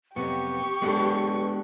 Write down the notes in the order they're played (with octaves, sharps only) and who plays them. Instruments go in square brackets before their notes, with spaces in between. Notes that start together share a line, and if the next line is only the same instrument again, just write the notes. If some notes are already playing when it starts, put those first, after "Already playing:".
[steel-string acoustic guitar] F2 C3 F#3 [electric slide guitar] B3 [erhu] G4 [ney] C#6
[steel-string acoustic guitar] F#2 A4 B4 [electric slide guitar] G#3 B3 D4